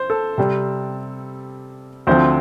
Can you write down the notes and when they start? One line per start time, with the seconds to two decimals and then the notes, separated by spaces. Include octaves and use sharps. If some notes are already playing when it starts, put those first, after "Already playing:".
Already playing: C5
0.10 A4
0.38 C3 G3 C4
2.07 D2 D3 F3 C4 C5